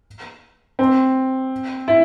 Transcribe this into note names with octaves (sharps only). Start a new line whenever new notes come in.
C4
E4